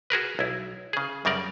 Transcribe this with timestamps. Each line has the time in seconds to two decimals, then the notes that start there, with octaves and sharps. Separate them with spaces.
0.10 F#4 G#4 A#4 B4
0.39 B1 E4
0.93 C#3 G#4
1.25 F#2 C#3 G3 A#4 D5